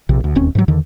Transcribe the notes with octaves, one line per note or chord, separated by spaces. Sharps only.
A#1 C3
D2
E1 D#2 C4 C#4
G#2 E3 F#3
E2 D3 D#3